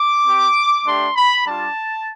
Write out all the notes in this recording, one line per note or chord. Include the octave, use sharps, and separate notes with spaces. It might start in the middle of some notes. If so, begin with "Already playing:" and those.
Already playing: D6
C4 G4
A3 D4 G4 C6
B5
G3 D4 F4 A5